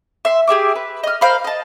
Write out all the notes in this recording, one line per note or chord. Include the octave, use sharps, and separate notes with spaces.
E5 C6
G4 G#4 E5 D6
B4
D#5 F6
A#4 C5 F5 B5
D#5 A5